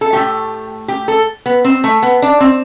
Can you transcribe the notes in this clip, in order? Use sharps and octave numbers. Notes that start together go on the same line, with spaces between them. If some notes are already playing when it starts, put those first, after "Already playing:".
A4
A2 E3 A3 G4
G4
A4
B3
C4
A3
B3
D4
C4